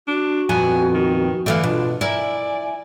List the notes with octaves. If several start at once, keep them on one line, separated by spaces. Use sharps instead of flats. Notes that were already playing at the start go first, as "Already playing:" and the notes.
D4 F#4
F2 A#2 B3 G#5
D#3
D3 E3 A3 F5
B2 D4 F4
E4 A#4 D5 G#5